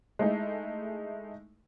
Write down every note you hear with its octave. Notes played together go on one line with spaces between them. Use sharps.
G#3 A3 D#4 E4